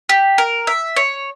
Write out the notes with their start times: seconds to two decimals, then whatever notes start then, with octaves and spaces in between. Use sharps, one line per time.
0.09 G4
0.38 A#4
0.67 E5
0.96 C#5